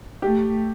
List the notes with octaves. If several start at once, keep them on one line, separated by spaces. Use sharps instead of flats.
A3 G4